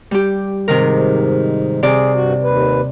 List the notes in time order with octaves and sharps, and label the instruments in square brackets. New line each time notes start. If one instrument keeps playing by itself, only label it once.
[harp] G3 G4
[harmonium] G#2 [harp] C3 D#3 A#4
[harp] C3 D5 [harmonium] G#4
[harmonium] G2 F#4
D#2 B4